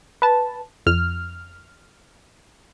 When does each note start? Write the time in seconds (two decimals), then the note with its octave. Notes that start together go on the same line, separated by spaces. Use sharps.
0.22 B4 A5
0.86 F2 F6